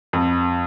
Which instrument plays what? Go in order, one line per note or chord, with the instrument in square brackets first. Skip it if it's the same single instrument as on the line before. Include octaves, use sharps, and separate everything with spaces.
[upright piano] F2